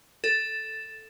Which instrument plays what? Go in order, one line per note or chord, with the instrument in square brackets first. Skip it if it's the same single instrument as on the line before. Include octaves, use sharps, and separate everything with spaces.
[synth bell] A4